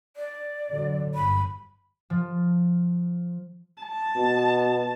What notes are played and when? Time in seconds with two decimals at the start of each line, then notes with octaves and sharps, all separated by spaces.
0.16 D5
0.70 D3 F#3
1.15 G1 B5
2.10 F3
3.83 A5
4.16 B2